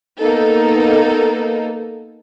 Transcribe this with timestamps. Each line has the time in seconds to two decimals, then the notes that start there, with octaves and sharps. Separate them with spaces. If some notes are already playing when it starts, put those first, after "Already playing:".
0.18 A#3 B3 D#4 A4